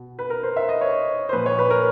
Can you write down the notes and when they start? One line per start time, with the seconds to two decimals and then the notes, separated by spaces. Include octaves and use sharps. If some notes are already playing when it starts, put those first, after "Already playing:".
Already playing: B2
0.19 B4
0.30 A#4
0.43 C5
0.56 E5
0.69 D#5
0.81 C#5
1.29 C5
1.33 A#2 F3 B4
1.46 C#5
1.59 B4
1.70 A#4